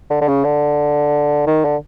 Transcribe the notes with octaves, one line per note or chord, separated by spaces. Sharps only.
D3
D3
C#3
D3
D#3
D3